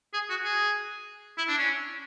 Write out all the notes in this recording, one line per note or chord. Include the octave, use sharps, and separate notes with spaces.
G#4
F#4
G#4
E4
D4
C#4